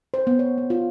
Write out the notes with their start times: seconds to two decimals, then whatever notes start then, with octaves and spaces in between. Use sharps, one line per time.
0.14 C5
0.27 B3
0.39 C#5
0.58 B3
0.70 F4